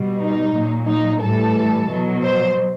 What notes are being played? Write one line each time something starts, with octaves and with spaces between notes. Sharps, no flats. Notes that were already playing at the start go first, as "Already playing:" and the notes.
Already playing: B2 G3
D#4
A#2 F#3
D#4
A2 E3 G3 A4
B2 F#3
C5